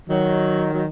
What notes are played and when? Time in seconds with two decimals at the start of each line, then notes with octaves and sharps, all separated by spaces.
0.09 D#3 F#3
0.72 F#3